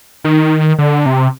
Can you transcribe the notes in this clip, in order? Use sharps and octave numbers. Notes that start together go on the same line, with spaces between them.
D#3
D3
C3